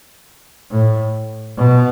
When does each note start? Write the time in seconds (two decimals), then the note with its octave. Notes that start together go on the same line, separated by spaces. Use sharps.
0.71 A2
1.58 B2